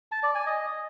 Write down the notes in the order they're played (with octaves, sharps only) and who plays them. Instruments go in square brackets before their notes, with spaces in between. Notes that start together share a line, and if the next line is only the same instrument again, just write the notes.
[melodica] A5
D5
G#5
D#5